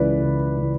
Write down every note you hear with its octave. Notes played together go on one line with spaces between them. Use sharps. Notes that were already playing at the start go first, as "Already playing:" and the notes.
Already playing: C#2 C#3 E3 B4 D5
C#2
C#3 E3